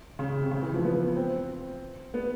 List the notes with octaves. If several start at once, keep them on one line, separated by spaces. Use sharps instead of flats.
C#3
C3
C#3
E3
F3
B3
C4
B3